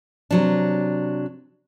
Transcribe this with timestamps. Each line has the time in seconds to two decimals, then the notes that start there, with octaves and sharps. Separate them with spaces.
0.31 C3 F#3 D4